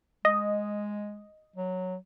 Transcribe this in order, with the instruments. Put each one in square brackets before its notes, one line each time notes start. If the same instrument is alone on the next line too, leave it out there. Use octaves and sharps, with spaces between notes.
[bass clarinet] G#3 [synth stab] D#5
[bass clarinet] F#3